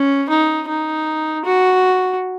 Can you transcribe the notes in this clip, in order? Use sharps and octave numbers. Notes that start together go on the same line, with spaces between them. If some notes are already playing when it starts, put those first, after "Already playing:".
Already playing: C#4
D#4
D#4
F#4